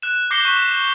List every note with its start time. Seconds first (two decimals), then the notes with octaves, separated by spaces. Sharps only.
0.03 F#6 E7
0.31 D6 G6 A#6 C7 C#7 G7
0.45 C#6 B6